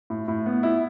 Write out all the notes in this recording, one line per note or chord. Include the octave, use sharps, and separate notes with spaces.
A2
A2
B3
E4